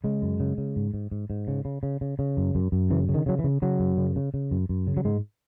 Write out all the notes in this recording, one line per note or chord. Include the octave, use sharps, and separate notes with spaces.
C#3 G#3
F#2
C#3
C#3
G#2
G#2
G#2
G#2
C#3
C#3
C#3
C#3
C#3
F#2
F#2
F#2
C#3 E3
C#3
D#3
C#3 F#3
E3
C#3
C#3 F#3
F#2
C#3
C#3
C#3
F#2
F#2
C#3
F#3
G#2 G#3